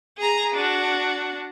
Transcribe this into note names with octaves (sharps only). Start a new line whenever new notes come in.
G#4 A#5
D4 F#4